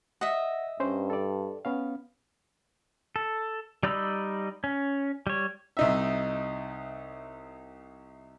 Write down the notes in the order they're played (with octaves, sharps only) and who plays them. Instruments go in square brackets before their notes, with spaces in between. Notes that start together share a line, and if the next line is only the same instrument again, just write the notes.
[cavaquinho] D#5 E5 [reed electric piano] F#5
[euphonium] G2 [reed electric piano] C#4 C5
[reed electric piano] A4 D5
B3 C#4 F5
[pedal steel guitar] A4
G3 D#4 D5 B5 E6
C#4
G3 C#5
[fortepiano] C2 D#4 E5